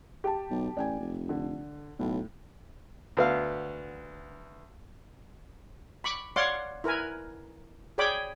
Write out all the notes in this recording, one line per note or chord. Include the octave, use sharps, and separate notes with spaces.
G4 A5
B1
A1 D5 G5 G#5
F1
D3
B1 A2
D2 B3 F5
B5 C#6 D6
C#5 D5 F5 F#5 C6 D6
E4 A#4 B4 G#5
G#4 C#5 D5 G5 B5 D6